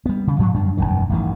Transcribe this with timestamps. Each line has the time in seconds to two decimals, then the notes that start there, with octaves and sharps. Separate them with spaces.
0.06 G3 B3
0.27 C#3
0.39 G#2 F3 F#3
0.54 F#2 G3 D4
0.77 E1 A#1 F#2 D#3
1.09 A1 G2 D#3